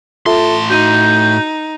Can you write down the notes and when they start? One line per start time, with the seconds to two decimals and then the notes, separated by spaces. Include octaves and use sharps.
0.26 A2 F4 A4 E5 A5 C6
0.70 D#4 F#4 G6 D#7